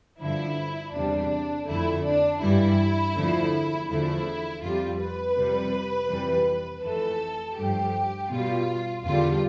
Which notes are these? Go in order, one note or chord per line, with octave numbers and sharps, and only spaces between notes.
G2 D3 F3 E4
E2 C3 G3 D4
F2 D3 A3 E4
D4
G2 E3 G3 E4
E2 D3 F3 A3
E2 D3 F3 A3 E4
F2 C3 G3 F4
B4
F2 C3 G3
F2 C3 E3 G3
F2 E3 A3 A4
G2 F3 A3 G4
B2 G3 F4
E2 D3 G3 F4